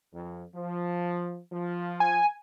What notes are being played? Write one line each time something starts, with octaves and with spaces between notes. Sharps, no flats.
F2
F3
F3
G#5